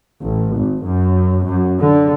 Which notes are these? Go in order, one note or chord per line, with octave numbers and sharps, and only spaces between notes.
A1
G#1
F#2
F#2
D3